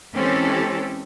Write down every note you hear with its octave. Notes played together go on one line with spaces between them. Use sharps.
E3 G#3 C4 C#4 G4 A4